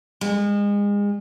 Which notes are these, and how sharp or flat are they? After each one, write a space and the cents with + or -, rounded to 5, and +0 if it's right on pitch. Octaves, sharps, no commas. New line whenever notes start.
G#3 -30